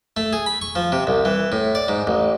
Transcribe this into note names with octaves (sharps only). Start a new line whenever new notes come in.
A3
G#4
B5
C#6
F3
C3
C2
E3
A2
D5
G#2
A1